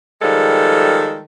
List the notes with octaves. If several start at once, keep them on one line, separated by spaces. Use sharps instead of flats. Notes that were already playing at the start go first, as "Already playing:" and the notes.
D#3 F3 G3 G#3 A4